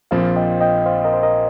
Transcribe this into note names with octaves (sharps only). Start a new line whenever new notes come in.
A#1 A#2 F3 C4 F4 C5 F5
D#5 G5
D#5 G5
C5 F5
A#4 D#5
C5
A#4 D#5